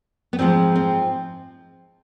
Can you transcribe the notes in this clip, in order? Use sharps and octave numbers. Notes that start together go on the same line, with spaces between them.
B3
G#2 F3 G#3 C4
C4